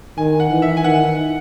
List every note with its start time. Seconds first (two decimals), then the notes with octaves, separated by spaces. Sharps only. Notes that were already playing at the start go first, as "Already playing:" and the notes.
0.17 D#3 G#5
0.40 F#5
0.51 E3
0.62 E5
0.77 G#5
0.84 D#3 F#5